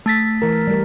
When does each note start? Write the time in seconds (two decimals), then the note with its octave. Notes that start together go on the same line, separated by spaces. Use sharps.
0.06 A3 A6 B6
0.42 E3 A#4
0.68 G3 A#4